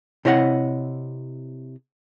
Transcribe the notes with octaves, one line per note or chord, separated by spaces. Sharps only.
C3 E4 C#5 D#5 F#5